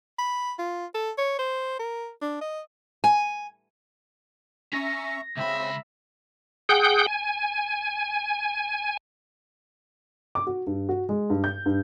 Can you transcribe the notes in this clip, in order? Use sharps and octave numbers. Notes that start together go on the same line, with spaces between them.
B5
F4
A4
C#5
C5
A#4
D4
D#5
G#5
C#4 E5 A#5 C#6 A#6
C#2 C#3 C4 E5 B5
G#4 F#5 G5 G6
G#5
D6
F#4
G2
F#4
G#3
G2
G6
G2